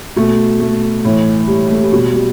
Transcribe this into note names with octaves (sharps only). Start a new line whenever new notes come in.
B2 A3
A3
A2 E3
G3
A3
G3
B2 G3
G3